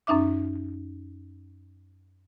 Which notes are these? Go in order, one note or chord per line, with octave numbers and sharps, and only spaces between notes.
F#2 C#4 D#4 E5 D6